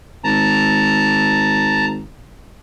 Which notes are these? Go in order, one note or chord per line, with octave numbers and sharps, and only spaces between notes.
G#1 A5 A#5